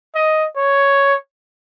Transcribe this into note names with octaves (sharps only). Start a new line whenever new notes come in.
D#5
C#5